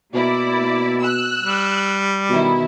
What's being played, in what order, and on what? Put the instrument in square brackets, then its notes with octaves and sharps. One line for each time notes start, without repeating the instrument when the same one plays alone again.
[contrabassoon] B2 [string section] A#3 E4 D5
[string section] E6 F#6
[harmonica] G3
[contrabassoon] B2 [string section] D#3 E4